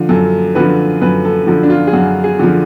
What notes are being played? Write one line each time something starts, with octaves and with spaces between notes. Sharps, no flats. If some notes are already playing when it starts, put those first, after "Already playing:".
Already playing: D3 F3
F#2 A4
D3 F3 B4
F#2 B4
A4
D3 F3 A4
D4
F4
G#4
F#2 F#4
G#4
D3 F3